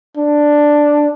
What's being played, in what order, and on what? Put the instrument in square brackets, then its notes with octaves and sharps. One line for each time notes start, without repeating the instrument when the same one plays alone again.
[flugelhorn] D4